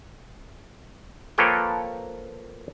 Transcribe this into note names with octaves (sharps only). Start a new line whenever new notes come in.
F3 A#3 A4 B4 C#5 G5